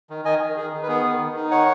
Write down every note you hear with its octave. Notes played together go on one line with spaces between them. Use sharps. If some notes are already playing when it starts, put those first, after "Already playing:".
D#3
D#3 D#5 G#5
D#3
D#3 G#4
D#3
B4
B3 G#4
D#3
D#3
D#4
D#3 C#5 F#5